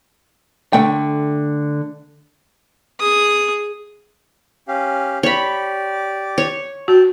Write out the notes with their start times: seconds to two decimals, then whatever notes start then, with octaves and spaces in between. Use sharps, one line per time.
0.73 D3 A3 G5
3.00 G#4 D#6
4.68 C#4 G4 F5
5.23 G4 C#5 D5 B5
6.38 C#5
6.88 F#4 G5 A5